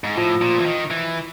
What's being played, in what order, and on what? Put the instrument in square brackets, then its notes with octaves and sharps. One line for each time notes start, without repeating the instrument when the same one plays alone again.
[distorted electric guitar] G#2
[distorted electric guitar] A2 [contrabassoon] F3
[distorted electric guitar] A#2
E3
D#3
E3